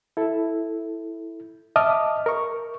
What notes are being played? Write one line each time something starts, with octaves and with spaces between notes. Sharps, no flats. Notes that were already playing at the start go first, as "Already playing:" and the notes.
E4 A4
D#5 E5 A5 D6 D#6 F6
A#4 C#6